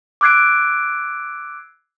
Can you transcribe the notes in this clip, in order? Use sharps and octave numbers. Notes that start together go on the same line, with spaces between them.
D6 E6 F#6 G#6 C7 D7